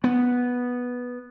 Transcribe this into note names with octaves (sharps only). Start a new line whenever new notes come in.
B3